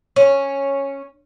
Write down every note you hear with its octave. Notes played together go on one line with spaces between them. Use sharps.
C#4